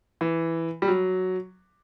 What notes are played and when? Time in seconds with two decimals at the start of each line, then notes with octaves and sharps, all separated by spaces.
0.21 E3
0.82 G3
0.88 F#3